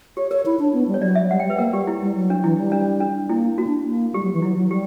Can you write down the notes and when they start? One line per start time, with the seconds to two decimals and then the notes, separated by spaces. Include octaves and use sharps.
0.17 G4 C#5
0.31 A#4 C#5
0.46 E4
0.59 D4
0.73 B3
0.88 G3
0.94 C#5
1.02 F#3 D5
1.15 E5
1.30 G3 F#5
1.40 G5
1.44 G3
1.50 B4
1.58 A#3 A#4
1.73 G3 G4
1.87 E4
2.01 G3
2.15 F#3
2.30 D4
2.44 E3 E4
2.57 G3
2.72 D4
3.01 D4
3.29 A#3 E4
3.58 A#3 F#4
3.67 D4
3.86 A#3
4.14 G3 G4
4.23 F#3
4.34 E3
4.42 F#3 E4
4.57 F#3
4.71 G3 G4